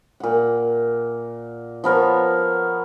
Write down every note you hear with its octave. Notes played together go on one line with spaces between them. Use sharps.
A#2 F#5
F3 B3 A#4 C#5